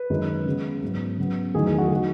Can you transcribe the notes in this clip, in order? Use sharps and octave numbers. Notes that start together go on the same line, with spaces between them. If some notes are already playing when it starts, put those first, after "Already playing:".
Already playing: B4
F#2 D#3 G#3
C#3 G#3 B3
G#2 F#3 B3
C#3 F#3 B3
E2 D#3 F#3 A3 G#4
G#4
F#4
G#4
D#3 F#3 B3 F#4